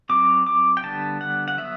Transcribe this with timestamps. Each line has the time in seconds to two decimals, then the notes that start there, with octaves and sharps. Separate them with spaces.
0.09 F#3 C4 D6
0.47 D6
0.77 G5
0.84 D3 G3 B3 A5
1.21 F#5
1.48 F#5
1.58 F#3 B3 E5